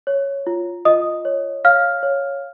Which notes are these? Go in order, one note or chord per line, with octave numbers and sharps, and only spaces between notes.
C#5
F4
F4 D#5 D#6
C#5
C#5 F5 F6
C#5